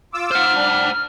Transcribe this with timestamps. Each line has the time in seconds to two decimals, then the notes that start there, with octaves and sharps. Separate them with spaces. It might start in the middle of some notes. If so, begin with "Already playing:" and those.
0.14 F4 D6 E6
0.31 C5 F#5 F6
0.54 G3 D4